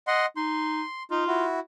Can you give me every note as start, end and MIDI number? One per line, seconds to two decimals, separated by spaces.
0.07 0.26 75
0.07 0.26 78
0.07 0.26 84
0.36 0.82 63
0.36 1.03 84
1.11 1.24 63
1.11 1.45 65
1.28 1.60 64
1.28 1.60 66